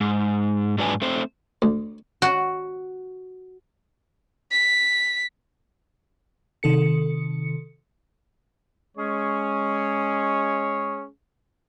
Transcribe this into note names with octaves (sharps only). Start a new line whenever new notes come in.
G#2
G#2 F#3 D4 B4 G#5
A3 C4 C5
D2
F#4
B6
C3 D#3 A4 C#7
G#3 C#4 G#4 C#5